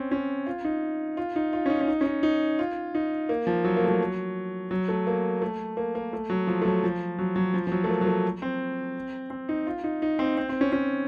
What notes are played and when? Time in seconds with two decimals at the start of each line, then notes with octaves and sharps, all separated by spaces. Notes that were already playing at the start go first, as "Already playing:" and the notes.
Already playing: C4 C#4
0.11 C#4
0.46 F4
0.65 D#4
1.17 F4
1.36 D#4
1.53 F4
1.66 C#4
1.70 D#4
1.80 C#4
1.88 D#4
2.01 C#4
2.06 D#4
2.23 D#4
2.59 F4
2.95 D#4
3.29 A#3
3.47 F3
3.64 F#3
3.77 A#3
3.84 A3
3.89 F#3
4.71 F#3
4.88 A3
5.07 A#3
5.42 A3
5.77 A#3
5.95 A#3
6.13 A3
6.30 F#3
6.47 F3
6.62 A3
6.65 F#3
6.84 F3
7.19 F#3
7.36 F#3
7.54 F3
7.67 F3
7.72 F#3
7.84 A3
7.90 A#3
8.01 F#3
8.07 A3
8.42 C4
9.30 C4
9.49 D#4
9.67 F4
9.84 D#4
10.02 D#4
10.19 C4
10.38 C4
10.49 C4
10.61 C#4
10.72 C#4